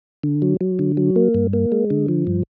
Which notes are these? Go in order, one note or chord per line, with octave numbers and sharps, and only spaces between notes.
D3
F#3
F#3
D3
F#3
A#3
G2
A#3
G#3
D3
F3
G2